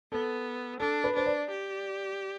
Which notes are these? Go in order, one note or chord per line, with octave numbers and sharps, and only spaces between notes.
B3 A4
D4 A4
B4
D4 C5
D5
G4